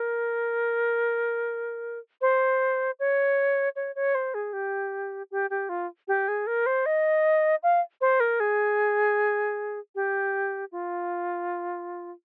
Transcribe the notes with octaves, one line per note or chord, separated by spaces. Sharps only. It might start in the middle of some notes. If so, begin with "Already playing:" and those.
Already playing: A#4
C5
C#5
C#5
C#5
C5
G#4
G4
G4
G4
F4
G4
G#4
A#4
C5
D#5
F5
C5
A#4
G#4
G4
F4